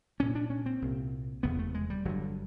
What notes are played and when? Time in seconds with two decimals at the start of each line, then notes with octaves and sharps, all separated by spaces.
0.20 C2 A#2 C#4
0.35 D4
0.50 C#4
0.66 C4
0.82 C2 A#2
1.43 F1 E2 C#3 B3
1.59 A3
1.74 G#3
1.90 G3
2.05 G1 G2 D3 F#3